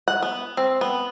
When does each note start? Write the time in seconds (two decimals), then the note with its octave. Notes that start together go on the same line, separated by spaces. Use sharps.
0.08 F#5
0.22 B3
0.57 C4
0.81 B3